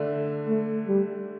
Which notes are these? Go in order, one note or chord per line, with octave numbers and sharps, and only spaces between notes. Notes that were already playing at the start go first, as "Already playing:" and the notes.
Already playing: D3 A3 D4
A3
G3